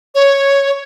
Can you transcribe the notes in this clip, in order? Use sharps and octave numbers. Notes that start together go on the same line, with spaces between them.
C#5